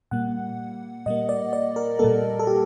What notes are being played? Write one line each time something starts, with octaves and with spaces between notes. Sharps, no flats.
A#2 G3 A#3 F#5
A#2 G3 A#3 D#5
D5
D5
A#4
A#2 G3 A#3 A4
A4
G4